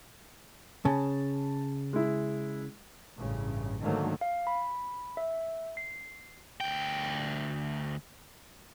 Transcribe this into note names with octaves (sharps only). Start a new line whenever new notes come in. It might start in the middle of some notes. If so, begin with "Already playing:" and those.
C#3 A5
G#3 E4
A1 G2 C#3
G#2 D3 D#3 F#3 A3 A#3
F5
B5
E5
C7
D2 G5